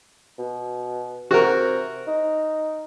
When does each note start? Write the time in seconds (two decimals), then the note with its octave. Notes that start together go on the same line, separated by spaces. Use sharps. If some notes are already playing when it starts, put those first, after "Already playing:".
0.38 B2
1.31 C3 F#4 A#4
2.07 D#4